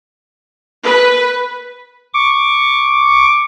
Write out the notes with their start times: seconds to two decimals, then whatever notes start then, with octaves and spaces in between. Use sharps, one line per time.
0.84 B4
2.14 C#6 D6